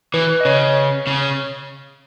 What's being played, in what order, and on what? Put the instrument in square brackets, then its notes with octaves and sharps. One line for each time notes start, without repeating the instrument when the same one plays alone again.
[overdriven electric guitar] E3 [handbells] B4
[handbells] D#5
[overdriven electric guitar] C#3 [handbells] C#5
[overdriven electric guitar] C#3